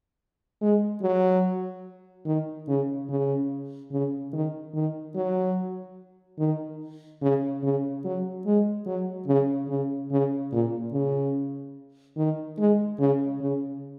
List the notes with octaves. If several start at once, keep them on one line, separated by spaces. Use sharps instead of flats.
G#3
F#3
D#3
C#3
C#3
C#3
D#3
D#3
F#3
D#3
C#3
C#3
F#3
G#3
F#3
C#3
C#3
C#3
A#2
C#3
D#3
G#3
C#3
C#3